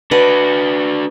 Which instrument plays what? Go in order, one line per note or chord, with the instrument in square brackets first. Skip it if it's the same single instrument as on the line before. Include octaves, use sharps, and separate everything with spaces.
[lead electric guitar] D4 F#4 [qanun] B4 D5 D#5